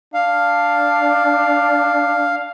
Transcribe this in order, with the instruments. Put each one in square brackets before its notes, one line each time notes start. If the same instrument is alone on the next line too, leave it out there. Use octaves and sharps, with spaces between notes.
[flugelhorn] D4 [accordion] F5